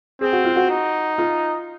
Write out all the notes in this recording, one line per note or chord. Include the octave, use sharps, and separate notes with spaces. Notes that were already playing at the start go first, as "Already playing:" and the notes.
C4 G#4
F#4
F4
F#4
D#4
F4